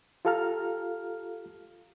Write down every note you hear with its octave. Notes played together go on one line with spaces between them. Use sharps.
F4 G4 A4 F5 A#5 F6